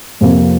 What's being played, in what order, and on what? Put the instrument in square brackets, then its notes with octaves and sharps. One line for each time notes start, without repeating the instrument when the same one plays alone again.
[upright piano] F2 C3 F3 A#3